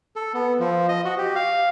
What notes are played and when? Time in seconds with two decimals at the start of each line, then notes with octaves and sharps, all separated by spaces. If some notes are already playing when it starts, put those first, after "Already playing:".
0.16 A4
0.34 B3
0.60 F3
0.89 D#5
1.05 F#4
1.18 G4
1.35 F5